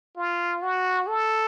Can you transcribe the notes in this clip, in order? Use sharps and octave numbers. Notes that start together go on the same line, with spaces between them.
F4
F#4
A4